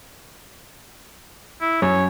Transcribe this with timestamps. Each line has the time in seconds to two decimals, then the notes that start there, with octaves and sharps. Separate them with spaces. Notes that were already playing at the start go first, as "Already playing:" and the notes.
1.61 E4
1.82 F#2 C#5